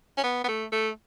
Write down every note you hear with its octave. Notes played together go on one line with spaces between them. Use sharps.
C#4
B3
B3
A3
A3